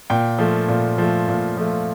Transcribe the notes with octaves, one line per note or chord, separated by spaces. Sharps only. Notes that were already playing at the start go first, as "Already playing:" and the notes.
A#2 G5
F3 A3
A#2
F3 A3
A#2
F3 A3